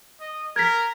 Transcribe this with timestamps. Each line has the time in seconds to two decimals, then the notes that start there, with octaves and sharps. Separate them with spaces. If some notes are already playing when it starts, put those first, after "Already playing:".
0.20 D#5
0.56 A#4 G#6 B6